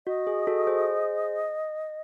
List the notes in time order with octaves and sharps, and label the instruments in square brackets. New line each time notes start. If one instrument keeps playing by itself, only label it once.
[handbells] F#4 [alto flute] D#5
[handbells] G#4
F#4 A4
G#4 C5